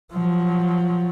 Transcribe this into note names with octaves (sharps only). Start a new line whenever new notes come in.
F3 F#3